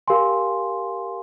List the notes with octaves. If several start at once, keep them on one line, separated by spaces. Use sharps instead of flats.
G4 A#4 F5 G#5 C6